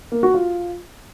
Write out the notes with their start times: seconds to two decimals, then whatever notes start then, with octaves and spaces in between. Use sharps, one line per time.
0.12 A#3
0.23 F#4
0.34 F4